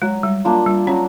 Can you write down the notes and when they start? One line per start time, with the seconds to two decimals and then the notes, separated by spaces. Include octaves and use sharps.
0.02 F#3 G#3
0.23 G3
0.45 A#3 D4 F4
0.66 G3
0.87 F#3 C#4